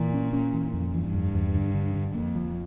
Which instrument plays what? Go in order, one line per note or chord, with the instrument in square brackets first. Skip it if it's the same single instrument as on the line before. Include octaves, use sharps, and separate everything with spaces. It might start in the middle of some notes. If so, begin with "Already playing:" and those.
Already playing: [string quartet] A#2 [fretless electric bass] E3
[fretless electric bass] C#4
C#4
E3
F2
[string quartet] G2 [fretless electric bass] E3
[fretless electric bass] F2
E2
D3
D3
D3
[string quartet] F2 [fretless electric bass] A#3
[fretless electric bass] F3